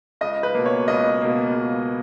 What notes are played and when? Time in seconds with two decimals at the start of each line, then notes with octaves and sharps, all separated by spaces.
0.21 C#2 D#5
0.43 B4
0.55 B2 A#3
0.66 C#5
0.88 C#2 D#5
1.21 B2 A#3
1.55 C#2